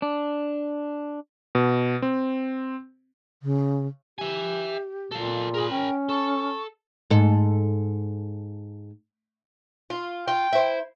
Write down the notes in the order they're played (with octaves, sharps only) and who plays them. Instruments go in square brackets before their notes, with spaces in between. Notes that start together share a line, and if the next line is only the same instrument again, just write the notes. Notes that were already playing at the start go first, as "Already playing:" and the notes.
[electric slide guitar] D4
[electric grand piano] B2
C4
[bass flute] C#3
[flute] G4 [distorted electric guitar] E5 G#5
[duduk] A#2 [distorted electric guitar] A4 F5
[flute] G#4 [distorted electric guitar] A#4 B5
[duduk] C#4 [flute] G5
[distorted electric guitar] A4 [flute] C#6
[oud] G#2 A4
[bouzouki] F4
[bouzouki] F4 [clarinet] G5
[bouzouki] E4 C5